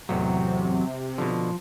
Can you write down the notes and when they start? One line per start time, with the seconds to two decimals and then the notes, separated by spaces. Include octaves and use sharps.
0.09 A1 E2 C3 F#3
1.18 B2 D3 F3